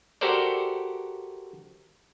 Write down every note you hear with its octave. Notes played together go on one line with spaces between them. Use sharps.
F#4 G4 A4 A#4 C5 D5